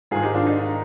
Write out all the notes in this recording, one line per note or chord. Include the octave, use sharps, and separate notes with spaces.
G#2 D#3 F4 G#4
D#4 G4
D4 F4
D#4